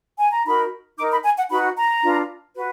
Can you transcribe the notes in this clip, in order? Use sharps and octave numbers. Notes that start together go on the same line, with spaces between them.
G#5
A#5
D#4 F#4 A#4 B5
D#4 A#4 D6
B5
G#5
F#5
D#4 F#4 B4 B5
A#5
D4 F4 B4
F#4 B4